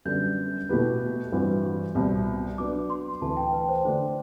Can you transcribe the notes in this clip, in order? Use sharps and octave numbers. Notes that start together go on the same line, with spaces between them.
F#2 D3 G3 B3 D4 G6
B2 A3 E4 G4 B4
G2 E3 G3 C4 F#4
C2 B2 G3 C4
F#3 B3 D4 D6
C6
D2 C3 E3 A5
G5
B4
C5
D3 A3 D4 C5